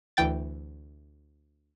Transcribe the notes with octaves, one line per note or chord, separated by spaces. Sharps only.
D2 E3 G5 A6